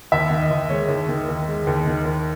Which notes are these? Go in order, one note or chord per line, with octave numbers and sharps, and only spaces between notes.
D#2 E5
D#3
D#5
D#2
G#3 C#5
D#2
D#3
D#2
G#3
D#2
D#3
D#2